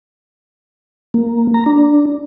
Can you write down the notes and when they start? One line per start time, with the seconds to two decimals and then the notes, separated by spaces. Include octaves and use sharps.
1.14 A#3
1.54 A#5
1.66 D4